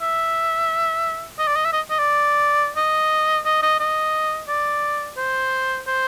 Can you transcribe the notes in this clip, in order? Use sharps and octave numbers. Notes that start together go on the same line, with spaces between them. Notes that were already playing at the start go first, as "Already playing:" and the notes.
E5
D#5
D5
D#5
E5
D#5
D#5
D5
D#5
D#5
D#5
D#5
D5
C5
C5